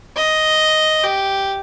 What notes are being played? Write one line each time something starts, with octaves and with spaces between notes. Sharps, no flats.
D#5
G4